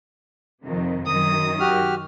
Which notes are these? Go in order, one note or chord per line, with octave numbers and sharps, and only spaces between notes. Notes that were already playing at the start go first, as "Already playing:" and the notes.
F2 C3 D#3
F#2 D#3 D#6
F#4 G4 F6